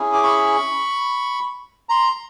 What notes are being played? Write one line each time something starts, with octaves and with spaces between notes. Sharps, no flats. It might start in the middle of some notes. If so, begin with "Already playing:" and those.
Already playing: C#4 E4 G#4
D6
B5 C#6
A#5 C6